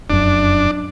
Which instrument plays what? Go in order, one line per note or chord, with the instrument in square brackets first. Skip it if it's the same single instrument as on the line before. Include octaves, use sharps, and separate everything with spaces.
[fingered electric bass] F1 F#2 [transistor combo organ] D4